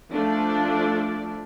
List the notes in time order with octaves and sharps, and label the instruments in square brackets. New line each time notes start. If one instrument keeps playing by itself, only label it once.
[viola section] F3 A3 D4 D5